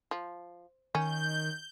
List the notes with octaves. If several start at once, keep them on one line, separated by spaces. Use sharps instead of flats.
F3
D#3 C#4 G6